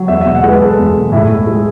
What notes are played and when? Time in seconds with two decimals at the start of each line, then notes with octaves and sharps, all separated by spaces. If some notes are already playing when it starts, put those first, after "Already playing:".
Already playing: F#3
0.08 E2 E5
0.21 B2 E5
0.35 F#5
0.44 G#3 B4
0.61 E2 A4
0.79 E2
0.96 B2
1.12 A2 E4
1.30 G#3
1.47 G#3